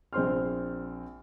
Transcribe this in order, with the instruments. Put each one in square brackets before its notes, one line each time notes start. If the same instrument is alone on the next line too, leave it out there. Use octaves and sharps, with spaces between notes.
[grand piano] A#1 C4 C6 F6